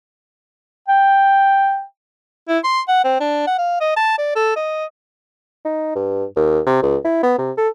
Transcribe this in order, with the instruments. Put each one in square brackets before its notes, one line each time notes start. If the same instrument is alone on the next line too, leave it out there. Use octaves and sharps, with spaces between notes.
[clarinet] G5
[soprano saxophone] E4
C6
F#5
C4
D4
F#5
F5
D#5
A5
D5
A4
D#5
[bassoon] D#4
G2
D#2
C3
C#2
E4
B3
C3
A4